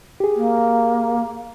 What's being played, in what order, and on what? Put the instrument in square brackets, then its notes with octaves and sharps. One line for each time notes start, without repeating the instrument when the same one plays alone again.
[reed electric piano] G4 G#4
[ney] A#3